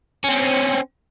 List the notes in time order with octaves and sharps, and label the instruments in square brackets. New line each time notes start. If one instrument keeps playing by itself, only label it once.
[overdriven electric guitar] C4 C#4